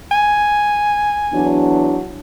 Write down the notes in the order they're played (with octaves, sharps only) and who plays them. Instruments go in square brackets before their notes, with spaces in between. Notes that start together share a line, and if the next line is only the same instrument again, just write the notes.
[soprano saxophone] G#5
[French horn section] E2 F#3 D4